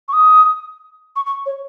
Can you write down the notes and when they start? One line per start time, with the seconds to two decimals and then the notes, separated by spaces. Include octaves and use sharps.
0.08 C#6
0.13 D#6
1.16 C#6
1.26 C#6
1.46 C#5